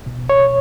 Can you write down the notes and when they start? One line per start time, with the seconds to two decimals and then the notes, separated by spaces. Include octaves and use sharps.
0.06 B2
0.29 C#5